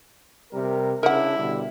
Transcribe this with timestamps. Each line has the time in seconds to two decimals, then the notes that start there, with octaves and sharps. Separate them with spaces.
0.52 C3 G3 A#4
1.03 C#3 D4 E4 A#4 F#5
1.36 B2 D3 G3